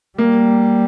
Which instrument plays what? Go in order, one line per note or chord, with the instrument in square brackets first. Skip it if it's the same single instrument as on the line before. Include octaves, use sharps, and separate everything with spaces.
[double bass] G3 [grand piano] A#3